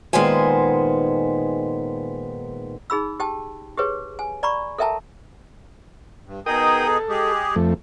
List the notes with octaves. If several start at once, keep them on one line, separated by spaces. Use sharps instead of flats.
A#2 D#3 G#3 B3 C5 G#5
D#4 G#4 B5 E6
G4 G5 A5
G4 G#4 B4 C#5
G#5
D5 A#5 B5 C#6
A4 A#4 E5 G5 A5 A#5
G2
B2 D#4 G#4 A#4 G5 D#6
A4
G#3 G4 G#4
F2 A3